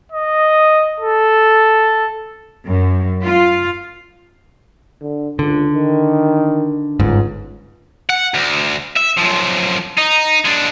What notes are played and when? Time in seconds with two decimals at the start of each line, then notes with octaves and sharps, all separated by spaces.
0.12 D#5
1.00 A4
2.67 F#2
3.23 F4
5.01 D3
5.39 C#2 D3
5.74 D#3
7.00 G1 C#2 G#2
8.10 F#5
8.34 D2
8.96 E5
9.17 F#2 F3
9.98 D#4
10.46 G#3 D4